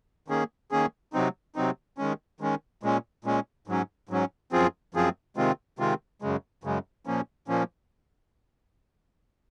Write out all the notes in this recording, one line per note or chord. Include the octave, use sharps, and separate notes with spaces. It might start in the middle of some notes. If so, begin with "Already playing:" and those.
D#3 A#3 C#4 G#4
D#3 A#3 C#4 G#4
C3 F#3 C4 D#4
C3 F#3 C4 D#4
D#3 G#3 C#4
D#3 G#3 C#4
A#2 G#3 C#4
A#2 G#3 C#4
G#2 F#3 C#4
G#2 F#3 C#4
F#2 F3 C4 F4 G#4
F#2 F3 C4 F4 G#4
C3 D#3 G#3 C4 F4
C3 D#3 G#3 C4 F4
F#2 C#3 G#3
F#2 C#3 G#3
A#2 F3 A#3 C#4
A#2 F3 A#3 C#4